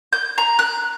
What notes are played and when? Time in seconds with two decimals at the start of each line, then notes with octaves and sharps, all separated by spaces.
0.13 G6
0.38 A#5
0.59 F#6